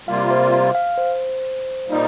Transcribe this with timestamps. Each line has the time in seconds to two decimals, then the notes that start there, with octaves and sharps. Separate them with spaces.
0.08 C3 G3 A#3 F4 F5
0.31 C5
0.52 F5
0.75 F5
0.98 C5
1.86 A#2 G3 D#4